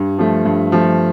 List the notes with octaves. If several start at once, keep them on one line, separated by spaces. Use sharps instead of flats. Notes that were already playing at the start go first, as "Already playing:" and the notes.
Already playing: G2
F3 A3
G2
F3 A3